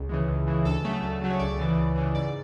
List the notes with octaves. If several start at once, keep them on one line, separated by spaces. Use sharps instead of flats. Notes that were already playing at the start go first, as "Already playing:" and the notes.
Already playing: C#2
C#3 E3 G#3
C#2
C#3 E3 G#3
D2 A4
C#3 F#3 A3
D2
C#3 F#3 A3
C#5
C#2 D5
C#3 E3
C#2
C#3 E3
G#2 D5